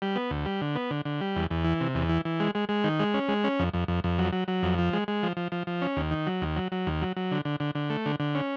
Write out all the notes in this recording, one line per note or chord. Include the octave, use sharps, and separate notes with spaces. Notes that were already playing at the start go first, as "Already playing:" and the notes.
G3
B3
D2
G3
D3
B3
D3
D3
G3
E2
E2
E3
C3
E2
E3
E3
G#3
G#3
G#3
D#3
G#3
C#4
G#3
C#4
F2
F2
F2
F2
F#3
F#3
F#3
F2
F3
G#3
G#3
F3
F3
F3
F3
C#4
D#2
D#3
F#3
D#2
F#3
F#3
D#2
F#3
F#3
D3
D3
D3
D3
A3
D3
D3
C#4